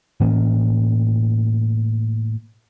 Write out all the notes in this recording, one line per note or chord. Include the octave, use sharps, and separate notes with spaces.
A2 E3 A#3 C#4